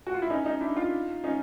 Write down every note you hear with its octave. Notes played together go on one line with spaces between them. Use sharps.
F#4
F4
E4
C#4 D#4
C#4 D#4
D4 E4
D#4 F4
C#4 D#4